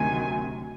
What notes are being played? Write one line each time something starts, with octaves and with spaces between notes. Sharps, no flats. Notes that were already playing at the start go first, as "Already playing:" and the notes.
Already playing: D2 C3 D#3 F#3 G#5